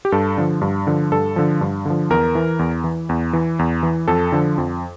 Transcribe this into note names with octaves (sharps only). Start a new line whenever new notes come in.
G4
G2 A4
D3 F3
G2
D3 F3
G2 A4
D3 F3
G2
D3 F3
E2 A#4
E3
E2
E3
E2
E3
E2
E3
F2 A4
D3 F3
F2